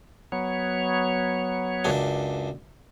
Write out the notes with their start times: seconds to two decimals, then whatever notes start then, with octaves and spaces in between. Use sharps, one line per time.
0.32 F#3 B3 C#5
1.84 C#2 F#2 D4